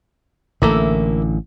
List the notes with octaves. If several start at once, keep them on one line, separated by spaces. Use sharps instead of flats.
A1 D3 A3 A#3 E4